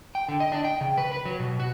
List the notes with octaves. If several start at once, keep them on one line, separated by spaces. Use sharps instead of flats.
G5
D3
D#5
D4
G5
C#3
B4
B4
F#3
B2
F#4